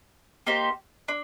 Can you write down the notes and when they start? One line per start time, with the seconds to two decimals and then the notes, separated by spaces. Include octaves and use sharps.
0.47 A#3 D#4 G4 C5
1.08 D4